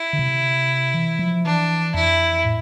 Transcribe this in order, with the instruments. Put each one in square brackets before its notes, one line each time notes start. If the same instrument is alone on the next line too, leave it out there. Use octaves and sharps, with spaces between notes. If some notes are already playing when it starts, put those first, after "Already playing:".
Already playing: [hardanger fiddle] E4
[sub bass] D3
C3
E3
F3
[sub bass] E3 [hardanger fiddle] D4
[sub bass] F2 [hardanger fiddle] E4
[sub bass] A2